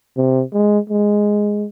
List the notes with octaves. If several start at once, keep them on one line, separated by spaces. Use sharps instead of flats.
C3
G#3
G#3